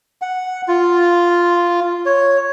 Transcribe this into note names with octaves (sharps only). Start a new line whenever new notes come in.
F#5
F4
C#5